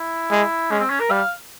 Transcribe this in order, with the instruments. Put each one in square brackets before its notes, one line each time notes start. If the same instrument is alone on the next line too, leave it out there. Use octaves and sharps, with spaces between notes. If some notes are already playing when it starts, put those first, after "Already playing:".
Already playing: [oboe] E4
[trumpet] G#3
[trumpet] G#3 [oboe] C#4
[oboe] C4
C#4
A#4
[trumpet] G3 [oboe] F5